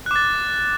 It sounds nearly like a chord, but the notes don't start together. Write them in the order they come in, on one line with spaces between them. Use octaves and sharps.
F#6 D6 A6